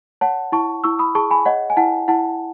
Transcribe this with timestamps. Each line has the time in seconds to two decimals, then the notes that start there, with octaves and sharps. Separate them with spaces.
0.21 C#5 F#5 A5
0.52 E4 A5 C#6
0.84 E4 C#6 E6
0.99 B5 D#6
1.15 G#4 A5 C#6
1.30 G#5 B5
1.45 C#5 D#5 F#5
1.70 G#5
1.77 E4 F#5 A5
2.08 E4 F#5 A5